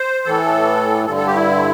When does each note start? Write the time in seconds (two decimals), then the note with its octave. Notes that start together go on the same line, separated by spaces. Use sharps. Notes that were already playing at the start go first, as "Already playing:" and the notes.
Already playing: C5
0.26 A2 E3 A4
1.06 G2 D3 A4
1.16 A4
1.27 G4
1.35 E4